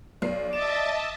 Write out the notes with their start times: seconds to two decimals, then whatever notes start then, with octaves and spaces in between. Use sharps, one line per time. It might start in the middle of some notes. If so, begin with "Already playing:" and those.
0.22 B1 D5 C7
0.53 D#5 E5 A5 D6 A6 E7